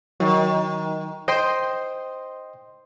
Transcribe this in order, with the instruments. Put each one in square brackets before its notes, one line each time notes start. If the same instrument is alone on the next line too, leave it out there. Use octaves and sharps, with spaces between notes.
[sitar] D#3 [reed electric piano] F#3
[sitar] C5 [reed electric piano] D#5 G5 C6